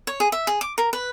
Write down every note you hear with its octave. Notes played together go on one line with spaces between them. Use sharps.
C#5
G#4
E5
G#4
D6
A#4
B4